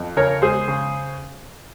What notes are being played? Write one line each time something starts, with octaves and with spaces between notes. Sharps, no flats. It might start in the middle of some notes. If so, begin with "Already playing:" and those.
Already playing: F2
C#3 A#4 C#5
G#3 G#4 C5
C#3